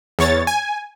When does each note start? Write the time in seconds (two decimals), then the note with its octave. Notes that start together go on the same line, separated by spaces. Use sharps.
0.19 E2 C#5 A6
0.47 G#5